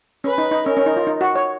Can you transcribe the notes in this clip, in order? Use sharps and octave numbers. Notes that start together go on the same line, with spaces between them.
C#4 B4
D#4
D#4
C#4 A#4
C#4
D#4
F4
D#4
F#4
C#5